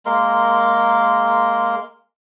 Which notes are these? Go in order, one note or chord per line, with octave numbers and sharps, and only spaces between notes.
G#3 A#3 A#4 C6